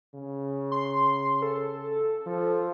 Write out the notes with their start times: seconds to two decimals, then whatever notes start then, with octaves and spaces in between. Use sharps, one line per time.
0.15 C#3
0.72 C6
1.42 A4
2.26 F3